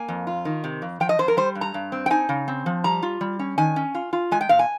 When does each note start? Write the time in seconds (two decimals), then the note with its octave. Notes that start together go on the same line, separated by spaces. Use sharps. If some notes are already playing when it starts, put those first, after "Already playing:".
Already playing: A#3 G#5
0.09 F2
0.27 F4
0.45 D#3
0.64 C3
0.82 F2
1.00 F3 G5
1.09 D#5
1.19 F2 C5
1.28 A#4
1.37 G3 C5
1.55 G2
1.61 A#5
1.74 G2
1.92 C4
2.06 G5
2.10 D#4 G#5
2.29 C#3
2.48 C4
2.66 F3
2.84 G3 A#5
3.03 F4
3.21 G3
3.39 C#4
3.58 D#3 G#5
3.76 C#4
3.95 F4
4.13 F4
4.31 G#3 G#5
4.41 G5
4.49 A#2 F5
4.59 G#5